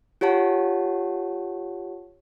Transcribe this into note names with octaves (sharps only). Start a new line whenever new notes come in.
F4 G4 C#5 F#5 A5